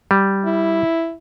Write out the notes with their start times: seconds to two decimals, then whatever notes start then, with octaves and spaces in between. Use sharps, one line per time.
0.11 G3
0.46 E4